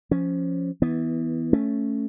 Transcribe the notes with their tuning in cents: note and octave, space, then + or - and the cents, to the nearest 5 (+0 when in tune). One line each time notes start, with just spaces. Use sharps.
F3 +0 C#4 +0
E3 -20 B3 +0
A3 +0 C#4 +0